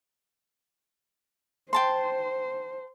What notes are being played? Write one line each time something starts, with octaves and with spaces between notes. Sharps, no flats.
C5 G5 A5 C6